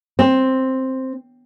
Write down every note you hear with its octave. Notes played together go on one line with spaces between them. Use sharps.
C4